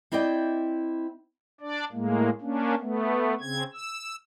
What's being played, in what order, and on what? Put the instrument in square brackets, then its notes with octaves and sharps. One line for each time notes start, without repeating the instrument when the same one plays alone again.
[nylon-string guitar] C4 E4 D5 D#5 G5
[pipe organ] D4 D5
A2 G#3 A#3
A#3 C#4 D4
A3 B3
C#3 C4 G#6
E6